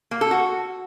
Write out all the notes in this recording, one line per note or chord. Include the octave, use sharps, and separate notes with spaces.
A#3
A4
F#4